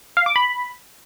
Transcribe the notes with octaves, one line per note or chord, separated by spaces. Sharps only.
F5
D6
B5